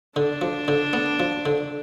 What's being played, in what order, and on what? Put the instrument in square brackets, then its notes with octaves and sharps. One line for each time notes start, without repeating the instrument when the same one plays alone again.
[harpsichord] D3 [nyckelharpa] D4
[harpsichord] F3
D3
B3
F3
D3